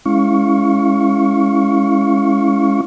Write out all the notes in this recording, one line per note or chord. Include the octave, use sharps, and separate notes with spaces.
G#3 C#4 E4 F5 C#6